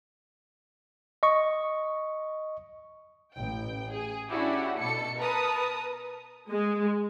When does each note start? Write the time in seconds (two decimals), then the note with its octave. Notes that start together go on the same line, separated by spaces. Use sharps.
1.23 D#5 C#6
3.34 A1 G5
3.92 G#4
4.29 C#4 D4 E4 F#4 G4
4.78 B2 A4 C#7
5.18 A#4 B4 A5 A#5 D#6
6.50 G#3